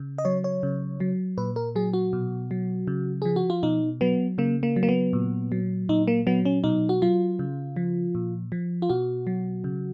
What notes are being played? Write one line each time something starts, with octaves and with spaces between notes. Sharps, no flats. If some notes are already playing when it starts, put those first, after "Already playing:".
Already playing: C#3
D#5
F#3 C#5
C#5
C#3
F#3
A#2 B4
A#4
F#3 G#4
F#4
B2
F#3
C#3
F3 G#4
F#4
F4
B2 D#4
F#3 B3
C#3 A#3
A#3
F#3
A#3
B3
A#2
F#3
A#2 D#4
A#3
F#3 B3
C#4
B2 D#4
F#4
F#3 F4
C#3
F3
A#2
F3
F4
B2 F#4
F#3
C#3